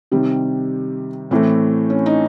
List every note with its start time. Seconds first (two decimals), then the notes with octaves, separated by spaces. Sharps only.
0.12 C3 D#3 G3 C4
1.31 A2 E3 A3 C4
1.90 C#4
2.06 D#4